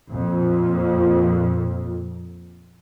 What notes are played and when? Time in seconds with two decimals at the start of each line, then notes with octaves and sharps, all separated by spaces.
0.11 F2 A#2